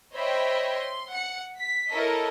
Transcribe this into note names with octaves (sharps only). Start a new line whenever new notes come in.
C5 C#5 D#5 E5 G5 B5
C6
F#5 C#7
B6
E4 A4 A#4 C#5 D#5